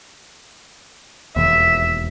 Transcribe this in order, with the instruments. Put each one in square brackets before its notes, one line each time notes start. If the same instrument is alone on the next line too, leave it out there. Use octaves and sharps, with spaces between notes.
[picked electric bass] E1 D#2 [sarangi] E5